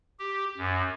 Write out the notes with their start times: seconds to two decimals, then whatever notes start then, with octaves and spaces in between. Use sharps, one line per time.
0.19 G4
0.58 F#2